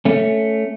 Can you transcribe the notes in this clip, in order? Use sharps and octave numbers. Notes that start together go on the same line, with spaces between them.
A3 C#4